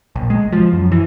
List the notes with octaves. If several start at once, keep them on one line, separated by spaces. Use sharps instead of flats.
A#1
G#3
F3
F#2
E3